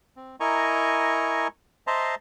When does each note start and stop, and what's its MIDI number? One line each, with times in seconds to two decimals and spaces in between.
0.16 0.36 60
0.40 1.48 64
0.40 1.48 70
0.40 1.48 75
0.40 1.48 80
0.40 1.48 82
0.40 1.48 85
1.87 2.15 72
1.87 2.15 75
1.87 2.15 76
1.87 2.15 81
1.87 2.15 82
1.87 2.15 84